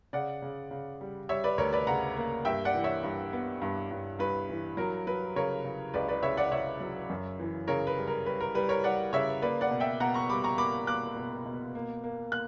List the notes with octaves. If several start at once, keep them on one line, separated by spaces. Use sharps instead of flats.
C#3 D5 F#5
C#3
C#3
G3
G3 C#5 E5
B4 D5
D2 A#4 C#5
B4 D5
C#3 F#5 A#5
A#3
G2 E5 G5
D5 F#5
E3
C#5 E5
G2
B3
G2
G2
G2 B4
E3
F#3 A#4
F#3 B4
C#3 A#4 C#5
C#3
C#2 B4 D5
B4 D5
C#3 C#5 E5
D5 F#5
C#3 C#5 E5
F#3
F#2
E3
C#3 A#4 C#5
B4
G3
A#4
G3 B4
A#4
G3 B4
A#4 C#5
G3 D5 F#5
C#3 C#5 E5
A#3 B4 D5
D5 F#5
B2
E5 G5
B2 F#5 A#5
A#5 C#6
G3 B5 D6
A#5 C#6
A#3 B5 D6
A#3 D6 F#6
B2
B2
A#3
A#3
A#3 F#6